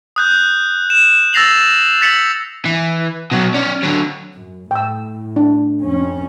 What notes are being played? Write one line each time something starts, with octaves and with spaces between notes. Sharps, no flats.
D#6 F#6 G6
E7
E6 A6 A#6 C7 F7 F#7
A6 B6 C#7 F7 F#7
E3
B2 F#3
C#4 D5
D3 F#3
F#2
A2 G5 E6
D4
F2 C#4